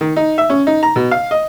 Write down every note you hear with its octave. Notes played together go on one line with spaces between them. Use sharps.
D#3
D#4
E5
C#4
D#4
A#5
B2
F5
D#5